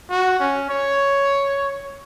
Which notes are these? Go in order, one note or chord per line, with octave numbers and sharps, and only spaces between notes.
F#4
C#4
C#5